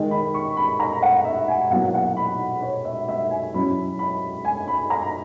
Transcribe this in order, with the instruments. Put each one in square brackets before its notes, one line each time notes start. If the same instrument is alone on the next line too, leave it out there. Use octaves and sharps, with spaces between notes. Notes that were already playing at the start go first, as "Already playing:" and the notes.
Already playing: [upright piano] D#3 G#3 D#4
B5
C#6
B5
A#5
F#5
E5
G#5
B2 F#3 A#3 E4 F#5
F#5
B5
C#5
E5
E5
G#5
F#3 C#4 E4 B5
B5
G#5
B5
A#5